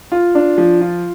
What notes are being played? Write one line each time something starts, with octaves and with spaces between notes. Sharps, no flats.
F4
D4
F3
F4